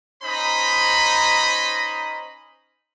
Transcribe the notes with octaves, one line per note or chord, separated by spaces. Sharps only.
C#4 D#4 C5 D#5 A#5 B5